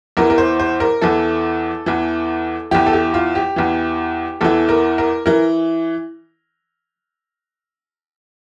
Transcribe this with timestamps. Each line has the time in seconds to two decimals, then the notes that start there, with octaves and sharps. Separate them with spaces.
0.17 E2 E3 A#4
0.30 A#4
0.38 C5
0.60 C5
0.80 A#4
1.02 E2 E3 A4
1.86 E2 E3
2.71 E2 E3 G4
2.86 A4
2.93 G4
3.14 F4
3.35 G4
3.56 E2 E3
4.41 E2 E3 A4
4.69 A#4
4.98 A#4
5.26 E3 A#4